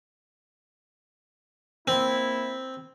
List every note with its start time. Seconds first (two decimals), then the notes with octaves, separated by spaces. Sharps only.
1.88 A#3 C4 E4